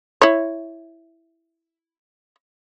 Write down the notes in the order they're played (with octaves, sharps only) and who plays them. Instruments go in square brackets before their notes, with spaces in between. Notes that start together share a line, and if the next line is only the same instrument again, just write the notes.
[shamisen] E4 C#5